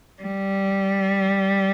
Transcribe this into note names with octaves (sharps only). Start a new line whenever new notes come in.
G3